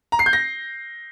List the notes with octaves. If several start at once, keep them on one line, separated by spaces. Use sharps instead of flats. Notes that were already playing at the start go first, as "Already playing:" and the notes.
A#5
C7
G6
A#6